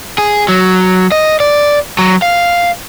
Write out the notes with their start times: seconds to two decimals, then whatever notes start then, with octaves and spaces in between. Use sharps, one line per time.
0.18 G#4
0.48 F#3
1.12 D#5
1.40 D5
1.99 F#3
2.22 F5